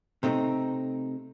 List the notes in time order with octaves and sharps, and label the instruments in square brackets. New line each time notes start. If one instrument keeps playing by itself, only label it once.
[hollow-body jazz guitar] C3 A3 C4 D#4